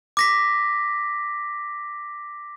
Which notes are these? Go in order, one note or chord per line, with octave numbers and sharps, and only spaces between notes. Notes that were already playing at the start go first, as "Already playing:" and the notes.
D6 A#6 B6